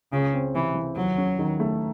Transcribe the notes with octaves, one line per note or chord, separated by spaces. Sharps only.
C#2 C#3
C4
C3 E3
E3
D#2 F#3
C#4
D#3
A3